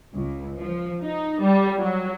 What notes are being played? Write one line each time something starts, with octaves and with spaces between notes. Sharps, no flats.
C#2
F3
D#4
G3
F#3